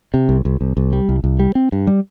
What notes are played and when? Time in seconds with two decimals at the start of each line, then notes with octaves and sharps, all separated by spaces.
0.14 C3
0.29 C2
0.45 C2
0.61 C2
0.77 C2
0.93 G3
1.09 C2
1.24 C2
1.39 G3
1.55 C4
1.72 G2
1.87 G3